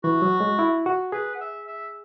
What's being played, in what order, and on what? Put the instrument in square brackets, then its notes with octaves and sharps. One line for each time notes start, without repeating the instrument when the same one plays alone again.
[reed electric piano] E3 [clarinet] F#4
[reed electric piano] F#3
G#3
E4
F#4
[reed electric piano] G#4 [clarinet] B4
[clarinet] F#5
E5
E5